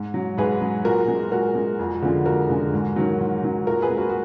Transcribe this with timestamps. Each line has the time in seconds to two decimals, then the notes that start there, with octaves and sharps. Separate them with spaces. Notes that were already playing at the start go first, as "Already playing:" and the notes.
Already playing: G#2
0.14 F#3
0.37 G#2 G#4 B4
0.62 F#3
0.85 A#2 F#4 A#4
1.08 G#3
1.32 A#2 F#4 A#4
1.55 G#3
1.79 F2
2.02 D3 F3 G#3
2.25 F2 F#4 A#4
2.49 D3 F3 G#3
2.73 G#2
2.96 D#3 F#3
3.20 G#2
3.43 D#3 F#3
3.67 A#2 F#4 A#4
3.82 G#4 B4
3.90 G#3
3.98 F#4 A#4
4.09 F#4